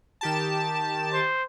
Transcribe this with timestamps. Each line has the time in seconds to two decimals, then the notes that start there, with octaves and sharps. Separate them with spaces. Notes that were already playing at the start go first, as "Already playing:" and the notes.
0.21 D#3 G4 A5
1.14 C5